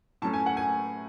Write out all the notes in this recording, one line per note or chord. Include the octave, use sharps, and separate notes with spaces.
A2 F#3 A3 C#4 A5
G#5
F#5
G#5